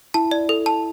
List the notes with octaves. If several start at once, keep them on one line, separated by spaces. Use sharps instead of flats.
E4 A5
D5
A4
A5